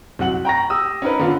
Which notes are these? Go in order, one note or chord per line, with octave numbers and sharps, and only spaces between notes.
C2 F#3 F#5 F#7
G5 A#5 C#6 A#6
G4 D#6 E6
C#4 D#4 A#4 B4
D3 B3 F4